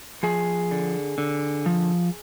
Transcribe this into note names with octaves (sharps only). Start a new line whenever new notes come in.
F3 G#4
D3
D3
F3